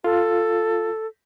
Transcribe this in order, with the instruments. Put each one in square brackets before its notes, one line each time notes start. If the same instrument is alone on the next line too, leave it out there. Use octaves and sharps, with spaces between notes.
[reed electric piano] F4 [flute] A4